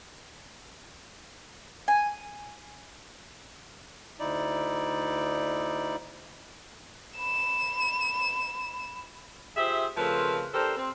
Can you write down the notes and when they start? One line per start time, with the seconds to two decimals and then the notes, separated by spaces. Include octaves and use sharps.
1.88 G#5
4.20 D2 D#4 E4 D5
7.18 B5 E7
9.56 F4 G4 G#4 C5 E5
9.97 C#3 F3 A3 C4 A#4 B4
10.53 D4 G4 A4 A#4 C5
10.77 C4